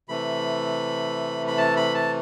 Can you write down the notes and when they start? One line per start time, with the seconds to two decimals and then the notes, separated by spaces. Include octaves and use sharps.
0.09 C3 E3 A3 B5
1.48 B5
1.58 A5
1.76 B5
1.95 A5